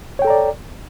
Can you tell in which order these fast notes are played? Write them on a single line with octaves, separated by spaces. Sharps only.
C#5 G5 A4 A#5 D5